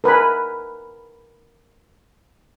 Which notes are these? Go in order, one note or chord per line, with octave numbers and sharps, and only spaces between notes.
A#4 B4 G#5 B5